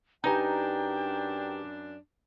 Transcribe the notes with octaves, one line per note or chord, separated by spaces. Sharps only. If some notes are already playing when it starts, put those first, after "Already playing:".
F#2 D4 D#4 G4 B4 G5 G#5 A#5